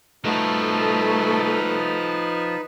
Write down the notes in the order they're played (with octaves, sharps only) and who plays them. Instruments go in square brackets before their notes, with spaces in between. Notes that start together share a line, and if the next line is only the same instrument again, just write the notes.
[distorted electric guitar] F3 F#4 [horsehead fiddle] A3 A4 [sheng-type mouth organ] D#4 B4